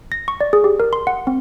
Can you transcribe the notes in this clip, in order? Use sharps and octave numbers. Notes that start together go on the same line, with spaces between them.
A#6
C#6
D5
G#4
G4
A#4
C6
F#5
C4